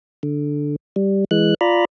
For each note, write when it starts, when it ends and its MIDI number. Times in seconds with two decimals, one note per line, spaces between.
0.23 0.76 50
0.96 1.25 55
1.31 1.54 52
1.31 1.54 56
1.31 1.54 90
1.61 1.85 65
1.61 1.85 74
1.61 1.85 82
1.61 1.85 83